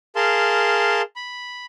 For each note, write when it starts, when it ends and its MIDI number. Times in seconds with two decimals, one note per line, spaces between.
0.16 1.02 68
0.16 1.02 70
0.16 1.02 77
0.16 1.02 81
0.16 1.02 84
1.16 1.66 83